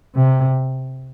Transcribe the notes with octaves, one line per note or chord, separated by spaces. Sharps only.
C3